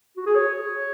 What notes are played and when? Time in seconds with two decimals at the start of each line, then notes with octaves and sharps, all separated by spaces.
0.17 F#4
0.26 G#4
0.35 C#5